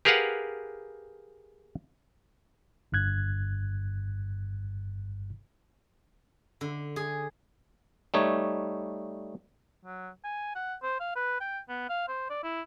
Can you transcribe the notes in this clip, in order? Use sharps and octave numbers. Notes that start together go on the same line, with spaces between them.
G4 G#4 A#4 B4 F5 F#5
G1 G2 F#6 G#6
D3
G#4
G3 A3 D#4 C#5
F#3
G#5
F#5
C5
F5
B4
G5
B3
F5
C5
D5
E4